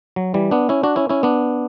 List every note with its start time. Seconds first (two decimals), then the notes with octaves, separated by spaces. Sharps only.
0.16 F#3
0.34 E3 G3
0.51 B3 D4
0.69 C#4 E4
0.83 D4 F#4
0.96 C#4 E4
1.09 C#4 E4
1.23 B3 D4